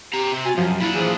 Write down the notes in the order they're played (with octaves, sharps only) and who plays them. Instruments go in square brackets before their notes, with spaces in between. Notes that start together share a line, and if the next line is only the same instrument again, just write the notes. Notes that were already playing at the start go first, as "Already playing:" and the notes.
[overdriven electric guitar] C4 A#5 [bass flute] G4
[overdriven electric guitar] C3 C4
[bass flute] F#4 [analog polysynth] G#5 A6
[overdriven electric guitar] F#2 [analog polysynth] F3 [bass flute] F#3
[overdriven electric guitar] A#2 D4 [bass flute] E4 [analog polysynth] B5
[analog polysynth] E3 F3 [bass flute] G#4